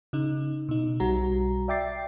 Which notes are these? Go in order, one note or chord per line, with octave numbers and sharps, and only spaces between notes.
C#3 D#4
B2 D#4
B1 G3 F#4 A#5
D5 E5 G5 D6 A6 C7